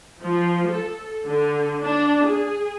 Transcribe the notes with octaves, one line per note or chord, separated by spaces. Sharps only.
F3
A4
D3
D4
G#4